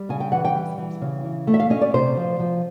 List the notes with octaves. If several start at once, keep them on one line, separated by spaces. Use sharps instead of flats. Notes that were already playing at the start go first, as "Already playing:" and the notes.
Already playing: G3
C#3 G#5
G5
E3 F#5
G5
G3
E3
C#3
E3
A3
E5
F5
C#4 D#5
D5
C3 C5
F3
F3